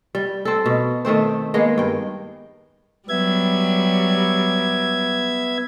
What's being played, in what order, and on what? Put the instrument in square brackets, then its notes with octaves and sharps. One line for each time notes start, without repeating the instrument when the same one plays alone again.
[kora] G3
C4 A4
B2
D#3 A3 C4 C5
G#3 A#3 B3
G2 G5
[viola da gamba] F#3 G3 [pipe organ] B3 E5 G#6